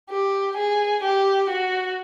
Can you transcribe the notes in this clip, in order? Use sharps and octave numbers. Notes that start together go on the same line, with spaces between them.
G4
G#4
G4
F#4